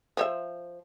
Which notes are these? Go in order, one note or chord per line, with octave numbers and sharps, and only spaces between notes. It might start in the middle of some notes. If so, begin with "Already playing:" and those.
F3 C5 E5